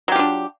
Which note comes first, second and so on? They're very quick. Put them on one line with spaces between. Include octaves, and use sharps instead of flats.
F#3 G4 F4 D4